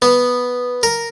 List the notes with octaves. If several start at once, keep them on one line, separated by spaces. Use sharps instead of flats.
B3
A#4